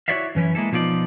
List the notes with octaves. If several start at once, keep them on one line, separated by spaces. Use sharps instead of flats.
E4 F#4 C#5 D5 E5 F5
F#2 E3 C#4 E4
G#3 A#3 E4 A4
B2 F3 D#4 F4 D5